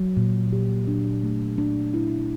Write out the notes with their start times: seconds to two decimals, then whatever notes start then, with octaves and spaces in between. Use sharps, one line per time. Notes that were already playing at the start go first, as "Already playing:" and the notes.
Already playing: F#3
0.17 A#2
0.53 G4
0.88 D4
1.23 A3
1.58 D4
1.94 E4